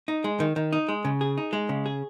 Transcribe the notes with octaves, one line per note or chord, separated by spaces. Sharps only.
D#4
G#3
D#3
D#3
D#4
G#3
C#3
G#4
D#4
G#3
C#3
G#4